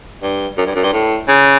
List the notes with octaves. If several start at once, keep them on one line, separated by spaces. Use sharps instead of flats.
G2
F#2
G2
F#2
G2
A2
C#3